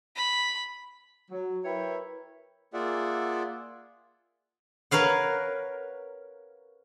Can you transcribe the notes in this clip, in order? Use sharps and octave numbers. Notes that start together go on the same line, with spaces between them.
B5
F#3
E4 A#4 B4 C#5 E5 G5
A#3 F4 G#4 D5 E5 F#5
A#4 B4 C#5 F5 F#5